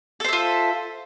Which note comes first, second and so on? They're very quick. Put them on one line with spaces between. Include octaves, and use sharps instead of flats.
A4 C5 E5 F4